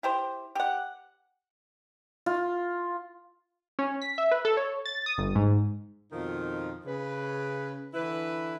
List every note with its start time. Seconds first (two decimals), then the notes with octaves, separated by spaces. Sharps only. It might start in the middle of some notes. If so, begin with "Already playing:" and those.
0.03 E4 G4 C5
0.55 G4 F#5
2.26 F4
3.79 C#4
4.02 B6
4.18 E5
4.31 B4
4.45 A4
4.57 C#5
4.86 A6
5.06 D#6
5.18 G1
5.35 G#2
6.12 F2 B2 D#3 F3 D#4 F4
6.86 C#3 B4
7.94 D3 E3 E4 B4